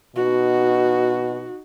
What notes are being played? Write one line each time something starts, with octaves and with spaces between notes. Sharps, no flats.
B2 D#4 F#4